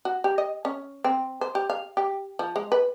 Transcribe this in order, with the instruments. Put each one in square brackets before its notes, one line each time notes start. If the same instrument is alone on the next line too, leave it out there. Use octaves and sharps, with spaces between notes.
[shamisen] F#4
G4
D#5
C#4
C4
C5
G4
F5
G4
F3
G#3
B4